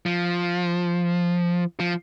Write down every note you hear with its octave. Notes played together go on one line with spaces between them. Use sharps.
F3
F3